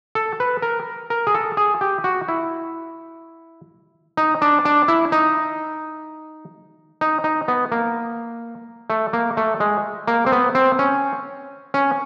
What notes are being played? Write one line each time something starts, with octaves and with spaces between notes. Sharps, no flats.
A4
B4
A#4
A#4
G#4
A4
G#4
G4
F#4
E4
D#4
D4
D4
E4
D#4
D#4
D#4
B3
A#3
A3
A#3
A3
G#3
A#3
C4
B3
C4
C#4
C#4